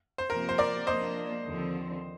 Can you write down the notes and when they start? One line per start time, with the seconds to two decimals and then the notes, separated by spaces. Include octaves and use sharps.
0.18 C5
0.29 C3 F3 A#3 A#4
0.49 C5
0.58 A#4 D5
0.87 F3 A#3 D4 C5 D#5
1.44 D#2 D3 F3 C4